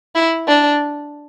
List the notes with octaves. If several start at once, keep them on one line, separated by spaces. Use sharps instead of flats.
E4
D4